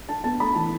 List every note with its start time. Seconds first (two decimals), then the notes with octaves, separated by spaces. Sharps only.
0.08 D4 A5
0.24 B3 A5
0.40 A3 B5
0.55 E3 A5